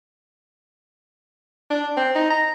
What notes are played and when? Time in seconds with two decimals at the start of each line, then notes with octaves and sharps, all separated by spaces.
1.70 D4
1.97 C4
2.15 D#4
2.30 A#5